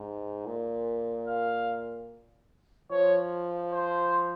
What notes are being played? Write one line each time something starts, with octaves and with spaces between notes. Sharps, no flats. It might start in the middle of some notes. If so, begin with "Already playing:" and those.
Already playing: G#2
A#2
F5
F3 C#5
C5